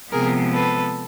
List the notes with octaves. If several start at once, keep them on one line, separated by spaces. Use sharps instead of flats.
C3 F3 G#3 B3 G#4 A#4
A4 B4